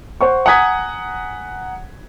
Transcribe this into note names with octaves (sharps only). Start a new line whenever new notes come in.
C5 F#5 C#6
F#5 G#5 A#5 D#6 G#6 B6